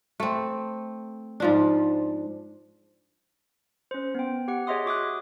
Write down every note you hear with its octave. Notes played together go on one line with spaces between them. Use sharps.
A3 C4
G#2 F3 D4
C#4 C5
B3 G5
G4 F#5
G#4 C#5 D#5 E5 C6 D#6
F#4 D6 D#6 F#6